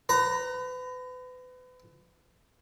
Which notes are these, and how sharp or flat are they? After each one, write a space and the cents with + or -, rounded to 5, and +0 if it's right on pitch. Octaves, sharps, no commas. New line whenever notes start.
B4 +35 A#5 +0